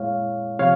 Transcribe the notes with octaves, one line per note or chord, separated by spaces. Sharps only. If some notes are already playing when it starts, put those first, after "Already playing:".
Already playing: A#2 G#3 E4 C#5 F5
C3 F3 C#5 F5